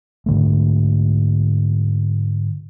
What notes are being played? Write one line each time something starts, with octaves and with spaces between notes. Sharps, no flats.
G#2 D3 A3